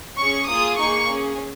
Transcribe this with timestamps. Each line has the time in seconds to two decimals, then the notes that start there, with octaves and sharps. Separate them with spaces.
0.18 C#4 G#4 C#6
0.49 A#3 F4 G#4 D#6
0.78 A#3 D#4 G#4 C#6
1.08 C#4 G#4